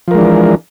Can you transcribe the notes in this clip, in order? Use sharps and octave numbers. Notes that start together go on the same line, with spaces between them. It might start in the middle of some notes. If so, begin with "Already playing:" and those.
E3 F3 G#3 D4 A#4